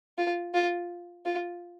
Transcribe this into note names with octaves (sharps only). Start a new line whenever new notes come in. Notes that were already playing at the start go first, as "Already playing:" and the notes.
F4
F4
F4